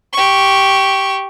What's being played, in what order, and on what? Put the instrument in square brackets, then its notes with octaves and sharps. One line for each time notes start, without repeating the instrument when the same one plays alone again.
[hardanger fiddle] G4 C#6